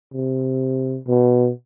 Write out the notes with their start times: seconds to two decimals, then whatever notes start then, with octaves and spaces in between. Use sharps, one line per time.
0.14 C3
1.08 B2